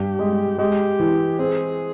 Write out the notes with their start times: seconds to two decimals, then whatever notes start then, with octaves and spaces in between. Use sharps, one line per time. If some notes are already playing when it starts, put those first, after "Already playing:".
Already playing: G2 G4
0.19 G#3
0.58 G#3 G4
0.99 E3
1.39 C4 G#4